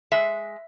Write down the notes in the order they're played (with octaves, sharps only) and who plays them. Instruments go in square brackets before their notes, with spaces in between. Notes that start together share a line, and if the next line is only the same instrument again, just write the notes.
[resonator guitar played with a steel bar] G#3 E5